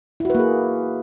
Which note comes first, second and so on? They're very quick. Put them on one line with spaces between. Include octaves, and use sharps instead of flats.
E4 F#4 B4 A#3 G#4